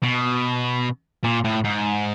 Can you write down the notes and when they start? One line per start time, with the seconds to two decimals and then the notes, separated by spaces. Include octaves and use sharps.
0.03 B2
1.24 A#2
1.44 A2
1.64 G#2